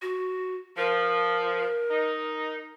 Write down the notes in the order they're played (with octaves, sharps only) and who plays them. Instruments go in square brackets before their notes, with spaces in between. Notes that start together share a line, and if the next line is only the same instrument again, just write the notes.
[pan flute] F#4
[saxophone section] F3 [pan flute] A#4
[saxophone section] D#4